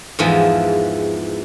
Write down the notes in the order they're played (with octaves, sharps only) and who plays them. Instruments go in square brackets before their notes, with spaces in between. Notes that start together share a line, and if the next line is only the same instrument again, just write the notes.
[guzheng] E2 G#2 E3 F3